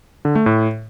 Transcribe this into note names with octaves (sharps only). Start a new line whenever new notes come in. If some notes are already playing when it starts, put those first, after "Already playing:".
D3
A3
A2